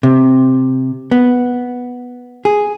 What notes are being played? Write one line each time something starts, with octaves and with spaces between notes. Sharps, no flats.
C3
B3
G#4